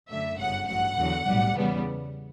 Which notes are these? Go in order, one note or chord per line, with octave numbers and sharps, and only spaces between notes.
F#2 D3 A3 E5
G1 F#2 C#3 F#5
A1 G2 F#3 F#5
E2 D3 F#3
B1 A2 G3
E2 C#3 G3 B3